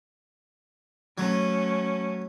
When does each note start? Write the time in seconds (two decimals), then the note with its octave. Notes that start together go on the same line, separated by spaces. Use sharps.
1.18 F#3 A3 C#4